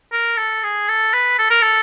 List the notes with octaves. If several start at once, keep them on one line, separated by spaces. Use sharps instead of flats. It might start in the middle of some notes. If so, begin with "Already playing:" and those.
A#4
A4
G#4
A4
B4
A4
A#4
A4